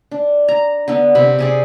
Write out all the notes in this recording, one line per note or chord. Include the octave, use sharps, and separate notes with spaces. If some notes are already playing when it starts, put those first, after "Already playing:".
D4
A#5
D3 B3
C3 B5
C3 G#4 D5